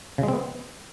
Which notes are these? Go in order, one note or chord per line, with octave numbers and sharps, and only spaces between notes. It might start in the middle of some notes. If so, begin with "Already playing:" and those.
C#3
G#3
C4
B3